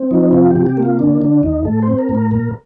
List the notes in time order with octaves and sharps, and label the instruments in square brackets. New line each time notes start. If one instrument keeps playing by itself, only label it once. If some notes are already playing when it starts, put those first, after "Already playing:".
Already playing: [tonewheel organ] C4
F3 D#4
C3 F4
G4
C3
G4
A#3
F4
D3 D4
D3 D4
D#2 D#4
A2 A4
C4 C5
A#4
A2
A#4
A#2 A#4